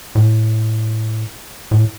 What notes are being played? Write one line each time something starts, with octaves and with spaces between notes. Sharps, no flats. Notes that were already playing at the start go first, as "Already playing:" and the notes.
A2
A2